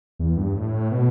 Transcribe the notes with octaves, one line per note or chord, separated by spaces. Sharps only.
E2
G2
A2
B2